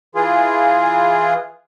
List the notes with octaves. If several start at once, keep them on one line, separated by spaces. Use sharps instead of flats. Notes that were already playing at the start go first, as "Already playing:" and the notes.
E3 F4 G#4